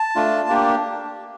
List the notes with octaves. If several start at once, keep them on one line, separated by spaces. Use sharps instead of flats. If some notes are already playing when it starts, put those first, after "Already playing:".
Already playing: A5
A3 D4 F4
A#3 D4 G4